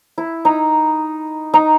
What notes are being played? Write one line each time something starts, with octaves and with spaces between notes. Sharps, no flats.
E4
D#4
D#4